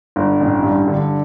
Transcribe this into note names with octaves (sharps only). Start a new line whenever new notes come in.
G1
A1
G2
D3